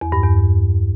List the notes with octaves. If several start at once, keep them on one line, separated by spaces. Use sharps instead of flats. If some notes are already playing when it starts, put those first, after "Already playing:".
E2
G2
E2